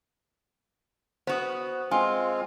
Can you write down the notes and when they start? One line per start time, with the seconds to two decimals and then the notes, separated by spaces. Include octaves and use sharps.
1.27 B3 F#4 C5 D#6
1.91 G#3 C4 F4 G#5